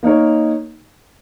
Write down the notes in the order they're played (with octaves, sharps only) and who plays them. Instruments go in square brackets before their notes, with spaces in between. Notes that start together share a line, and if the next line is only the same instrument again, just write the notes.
[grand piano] A#3 D#4 A#4 C#5